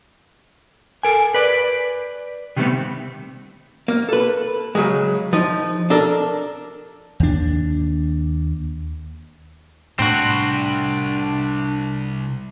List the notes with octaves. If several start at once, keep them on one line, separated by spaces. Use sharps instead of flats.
A4 A#4 G#5
B4 D5
C3 D#3 G3 A3 B3 C4
A#3
A4 B4
C#3 F#3 G#3
F3 D#4
D4 A4 A#4
D#2 D4
C2 A2 C4 D4 F#4 B5